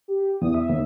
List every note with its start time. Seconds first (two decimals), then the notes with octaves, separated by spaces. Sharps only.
0.08 G4
0.42 E2 D#6
0.54 E5
0.69 D#2